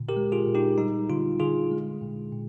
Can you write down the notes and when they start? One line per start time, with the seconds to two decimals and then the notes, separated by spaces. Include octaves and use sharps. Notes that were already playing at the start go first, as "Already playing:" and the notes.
Already playing: A#2 D3
0.09 G4 A#4
0.16 G#3
0.32 F4 G#4
0.47 A#2
0.55 D#4 G4
0.78 G3 D#4
1.10 D3 F4
1.40 D3 F4 G#4
1.71 G#3
2.02 A#2
2.33 A#2